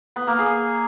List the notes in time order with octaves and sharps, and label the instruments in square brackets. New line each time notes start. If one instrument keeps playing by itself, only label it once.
[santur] B3
A#3
G#4